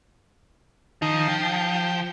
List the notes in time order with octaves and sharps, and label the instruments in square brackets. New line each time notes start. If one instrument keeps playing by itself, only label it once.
[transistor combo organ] D#3 D#4 [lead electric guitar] F3
[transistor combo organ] G5